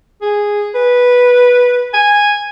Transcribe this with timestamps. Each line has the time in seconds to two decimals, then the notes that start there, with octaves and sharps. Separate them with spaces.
0.22 G#4
0.75 B4
1.94 G#5